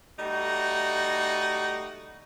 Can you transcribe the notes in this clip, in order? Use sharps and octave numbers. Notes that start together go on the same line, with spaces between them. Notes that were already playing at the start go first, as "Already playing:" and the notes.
G3 A3 D#4 F#4